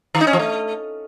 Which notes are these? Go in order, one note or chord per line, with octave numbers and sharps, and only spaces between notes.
D#3
D#4
C#4
F3
A3